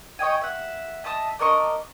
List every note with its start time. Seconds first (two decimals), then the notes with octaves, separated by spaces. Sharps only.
0.19 C#5 D#5 G5 G#5
0.41 E5 F#5
1.04 D#5 E5 A5 D#6
1.39 D4 A#4 D#5 C#6